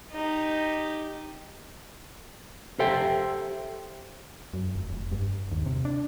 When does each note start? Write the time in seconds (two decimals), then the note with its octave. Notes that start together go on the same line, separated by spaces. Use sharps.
0.12 D#4 G4
2.79 G4 A4 C5 E5 G5
4.54 F#2
4.75 F1
4.92 F1
5.12 G2
5.52 D#2
5.66 C3
5.85 D4